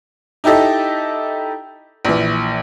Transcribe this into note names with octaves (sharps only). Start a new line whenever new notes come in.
D#4 E4 G4 A4 D#5
A#1 E3